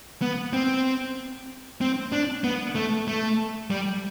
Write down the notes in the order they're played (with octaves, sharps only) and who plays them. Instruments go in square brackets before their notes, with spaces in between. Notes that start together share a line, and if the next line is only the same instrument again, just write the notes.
[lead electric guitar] B3
C4
C4
D4
B3
A3
A3
G3